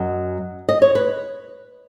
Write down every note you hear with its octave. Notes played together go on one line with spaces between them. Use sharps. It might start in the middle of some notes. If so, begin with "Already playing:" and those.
Already playing: F#2 F#3 D#5
D#5
C#5
B4